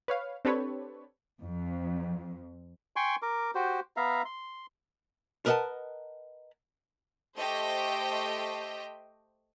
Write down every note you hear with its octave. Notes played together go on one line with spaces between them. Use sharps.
B4 C#5 F5
C4 D4 G4 A4 B4 C#5
F2
G5 G#5 C6 C#6
A#4 D6
F#4 G4 C5
B3 E5 F5 A#5
C6
A#4 B4 D#5 E5 F#5 A5
A3 G4 C5 D#5 G5